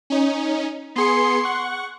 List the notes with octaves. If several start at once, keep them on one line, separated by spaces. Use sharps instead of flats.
C#4 D#4
B3 G#4 C6 C#7
F#5 C#6